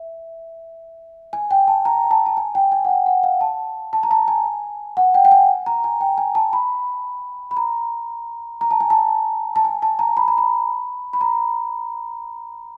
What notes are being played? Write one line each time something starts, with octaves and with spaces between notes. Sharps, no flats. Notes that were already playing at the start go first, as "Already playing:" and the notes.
Already playing: E5
G#5
G5
A5
A#5
A5
A5
G#5
G5
G#5
F#5
G5
F#5
F5
A5
A5
A#5
A5
G#5
F#5
G5
G5
G#5
A#5
G#5
G5
G#5
A5
B5
B5
A#5
A#5
A5
G#5
A5
A5
G#5
A5
A#5
B5
A#5
B5
B5
A#5